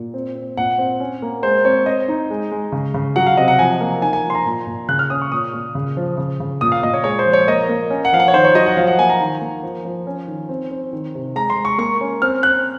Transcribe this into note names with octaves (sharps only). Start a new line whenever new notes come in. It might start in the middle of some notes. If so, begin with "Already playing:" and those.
Already playing: A#2
C4
C4
A#2 F#5
C4
C#4
A#3
G#3 C5
C4 C#5
C4 D#5
D#4
G#3
G#3
C#3
C#3
F#3 F#5
F5
C3 D#5
F#5
F3 G#5
A#3
D#4 G#5
G#5
F3
C6
A#5
A#2
A#2
C#3 F#6
F6
C#4 D#6
C#6
A#2 D#6
A#2
C#3
F3
C#3
C#3
A#2 D#6
F5
A#2 D#5
C#5
G#3 C#5
C5
F3
C#5
A#3 D#5
A#3
C#4
F#5
F3 F5
F#5
C#5
D#3 C5
C#5
F#3 D#5
F#5
F3 F5
F#5
A#3 G#5
A#5
D#3
A#3
F3
F3
C#4
D#3
C4
C4
D#3
C3
G#3 A#5
C6
G#3
C#6
A#3 C#6
C#4
C4 F6
C4 F#6